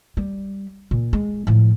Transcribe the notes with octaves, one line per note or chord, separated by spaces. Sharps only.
G3
A#2
G#3
A2 F3